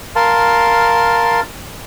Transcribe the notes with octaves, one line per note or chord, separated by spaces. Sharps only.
A#4 F5 A5 C6